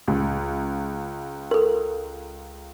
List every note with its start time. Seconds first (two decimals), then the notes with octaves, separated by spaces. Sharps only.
0.08 C#2
1.51 A4 A#4